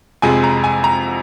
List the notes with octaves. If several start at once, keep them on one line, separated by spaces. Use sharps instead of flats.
F2 C3 F3 G#3 G#5
A#5
G#5
A#5